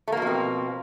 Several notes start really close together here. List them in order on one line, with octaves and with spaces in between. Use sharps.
A3 A#3 B2 F3 C4